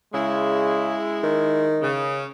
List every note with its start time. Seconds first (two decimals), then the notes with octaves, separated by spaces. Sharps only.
0.14 C#3 G#3 E4
1.23 D#3
1.82 C#3